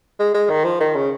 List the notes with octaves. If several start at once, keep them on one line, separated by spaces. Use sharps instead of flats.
G#3
G#3
D#3
F3
D#3
C#3